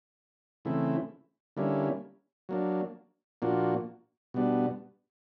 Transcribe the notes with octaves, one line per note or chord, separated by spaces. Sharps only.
C#3 E3 A3 C4 E4
D3 G3 A#3 C#4 E4
F#3 A#3 D4
A#2 F3 A#3 D4 F#4
B2 G3 B3 D4